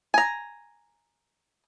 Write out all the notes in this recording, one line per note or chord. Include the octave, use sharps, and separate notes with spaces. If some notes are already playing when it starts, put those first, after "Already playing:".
G#5 A#5